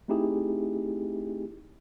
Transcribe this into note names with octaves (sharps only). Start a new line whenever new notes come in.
A3 C4 D#4 E4 G4 G#4